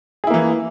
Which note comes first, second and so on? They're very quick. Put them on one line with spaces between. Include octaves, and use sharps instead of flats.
G#4 E4 A#3 E3